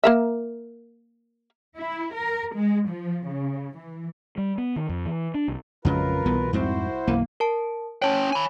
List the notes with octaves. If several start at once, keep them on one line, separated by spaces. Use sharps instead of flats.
A#3 A#4 E5
E4
A#4
G#3
F3
C#3
E3
G3
B3
D#3
F2
E3
D4
C2
A1 F2 C#3 F#3 G#3 F4 A#4 B4
C2 B2 E3 B3
F2 G#2 C4 E4 F#4 C5
B1 F#2 E3 A#3
A#4 A5
C#4 C#5 G5 A5
G#5 B5